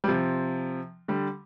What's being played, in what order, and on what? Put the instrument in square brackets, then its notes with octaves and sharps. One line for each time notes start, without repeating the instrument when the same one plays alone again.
[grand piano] G3
C3 F3
D3 G3